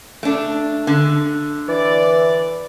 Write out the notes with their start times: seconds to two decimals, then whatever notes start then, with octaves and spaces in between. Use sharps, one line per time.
0.23 A3 D4
0.87 D3
1.68 E3 D5